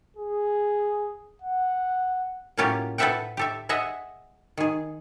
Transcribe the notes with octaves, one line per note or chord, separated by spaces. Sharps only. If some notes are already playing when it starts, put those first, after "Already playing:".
G#4
F#5
A2 F#3 A#3 C#4 F4 G4
A4 B4 C5 E5 F#5 G5
G4 A4 E5
G#4 D#5 E5 F#5
D#3 G#4